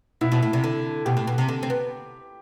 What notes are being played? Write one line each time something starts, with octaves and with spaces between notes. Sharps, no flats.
B2 E4
B2
A2
C3
D3
B2 G4
A2
B2
C3
D3
C4
B3